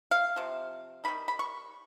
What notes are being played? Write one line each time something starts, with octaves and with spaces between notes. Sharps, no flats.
F5
C3 F3
D#3 G3 A#3 D#4 B5
B5
C#6